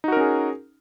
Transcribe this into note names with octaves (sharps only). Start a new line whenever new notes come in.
C#4 D#4 F#4 G#4 A#4